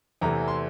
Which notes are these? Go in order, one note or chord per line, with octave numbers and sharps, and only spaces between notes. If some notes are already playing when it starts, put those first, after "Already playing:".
E2 C3 E3 A3 A#5
C6